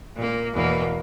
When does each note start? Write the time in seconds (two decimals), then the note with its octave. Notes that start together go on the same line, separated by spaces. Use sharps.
0.16 A#2 A#3
0.53 E2 B2 A#3